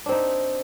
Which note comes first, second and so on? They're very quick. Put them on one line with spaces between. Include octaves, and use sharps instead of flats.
D4 C4 D#4